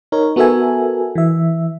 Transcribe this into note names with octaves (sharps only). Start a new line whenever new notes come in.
D#4 A#4 C#5
B3 F#4 A4 A#4 E5 G#5
E3 E5